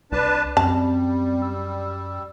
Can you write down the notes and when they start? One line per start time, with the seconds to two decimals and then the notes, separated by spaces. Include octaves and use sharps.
0.12 C2 D4 B4 A5
0.57 F#2 G3 C4 A5
1.42 E6